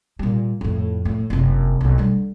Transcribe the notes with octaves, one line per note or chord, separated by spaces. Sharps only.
A#2 G3
F2 A2
A2
F#1 C3
B1 C4
D3 G3